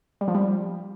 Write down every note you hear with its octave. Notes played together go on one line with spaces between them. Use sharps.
G3
F3
G3